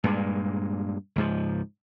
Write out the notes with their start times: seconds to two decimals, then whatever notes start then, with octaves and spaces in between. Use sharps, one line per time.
0.04 G2 A#2 G#3
1.16 C#2 G#2 F3